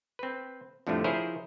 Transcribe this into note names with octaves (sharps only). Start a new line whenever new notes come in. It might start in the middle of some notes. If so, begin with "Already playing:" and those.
C4 B4
F2 A2 D3 F3 G3 A3
F3 E4 G#4 A#4 C5 C#5